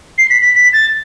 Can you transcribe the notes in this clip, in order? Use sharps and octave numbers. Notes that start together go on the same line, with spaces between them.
C7
B6
B6
B6
A6